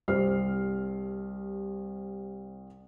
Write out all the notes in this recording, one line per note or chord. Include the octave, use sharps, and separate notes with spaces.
C2 C3 C5 F6 C7